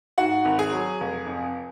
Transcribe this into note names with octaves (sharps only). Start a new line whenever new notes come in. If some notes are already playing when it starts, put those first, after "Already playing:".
G#2 F#4 F#5
G#1
G#4 G#5
F#3
F1
F2